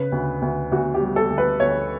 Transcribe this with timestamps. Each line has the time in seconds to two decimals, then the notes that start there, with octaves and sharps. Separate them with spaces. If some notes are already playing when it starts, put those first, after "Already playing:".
Already playing: C#3 B4
0.12 D2
0.42 D2
0.72 D2 F#4
0.94 G4
1.01 G3
1.16 A4
1.30 D2
1.38 B4
1.60 D2 C#5